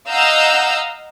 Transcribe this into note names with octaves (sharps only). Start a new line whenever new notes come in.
D#5 F5 F#5 A#5 E6 G6